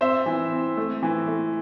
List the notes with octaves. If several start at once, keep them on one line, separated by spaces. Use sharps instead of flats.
C4 C5 E5
E3
C4
A3
E3
A3